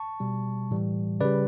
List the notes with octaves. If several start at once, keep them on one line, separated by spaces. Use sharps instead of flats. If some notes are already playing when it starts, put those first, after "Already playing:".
Already playing: A5 C#6
B2 G3
A2 E3 G3
C#3 G3 B4 D5